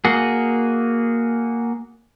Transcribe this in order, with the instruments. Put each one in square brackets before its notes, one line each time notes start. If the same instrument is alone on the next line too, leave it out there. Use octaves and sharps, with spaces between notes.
[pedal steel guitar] A#3 F#4 G#4